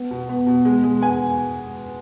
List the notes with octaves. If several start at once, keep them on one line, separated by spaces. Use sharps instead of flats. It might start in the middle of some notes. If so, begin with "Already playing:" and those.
Already playing: B3
B2
B3
B2
G#3
G#3
B3 G#5